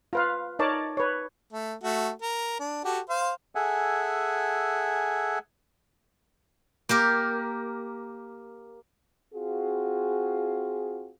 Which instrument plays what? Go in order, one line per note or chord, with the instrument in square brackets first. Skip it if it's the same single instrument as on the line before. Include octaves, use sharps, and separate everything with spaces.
[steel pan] F4 B4 F5
D#4 A#4 C#5 D5 A5
B4 C#5
[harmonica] A3
A3 F#4
A#4
D4
F#4 G4 A4
C5 F5
[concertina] G#4 A4 E5 F#5 G#5
[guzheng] A#3 G4 A#4
[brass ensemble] C4 F4 F#4 G#4